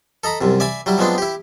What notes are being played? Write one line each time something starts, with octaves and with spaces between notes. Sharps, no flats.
A4 D#5 A#5 B5
C2 F#2 C3
D5 E5 G#5 B5
F#3 G3 E4
F3 F#3 G#3 B3 C4 D4
E4 G4